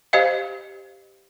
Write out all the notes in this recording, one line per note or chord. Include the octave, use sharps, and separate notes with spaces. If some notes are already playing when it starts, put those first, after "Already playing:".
G4 C5 D#5 F5